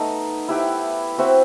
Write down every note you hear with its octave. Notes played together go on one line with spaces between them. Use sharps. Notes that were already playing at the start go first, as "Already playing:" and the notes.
Already playing: A3 B3 D#4 A4 D#5
E4 G4 B4 E5
C4 F#4 B4 E5